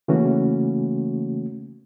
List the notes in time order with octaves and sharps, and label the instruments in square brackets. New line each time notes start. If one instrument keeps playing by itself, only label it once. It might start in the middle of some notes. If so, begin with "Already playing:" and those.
[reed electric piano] C#3 E3 A3 A#3 C#4 F#4